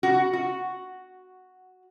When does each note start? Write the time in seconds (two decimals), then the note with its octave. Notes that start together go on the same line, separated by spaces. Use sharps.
0.03 F#4
0.33 F#4